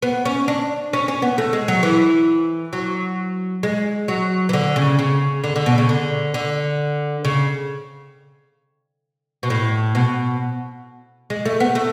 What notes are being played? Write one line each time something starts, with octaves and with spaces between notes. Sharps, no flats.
B3
C#4
D4
C#4
C#4
B3
A3
G#3
F#3
E3
F#3
G#3
F#3
E3
D3
C#3
C#3
D3
D3
B2
C#3
D3
D3
C#3
B2
A2
B2
G#3
A3
B3
A3